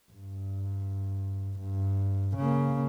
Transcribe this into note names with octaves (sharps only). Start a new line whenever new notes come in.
G2
G2
C#3 A#3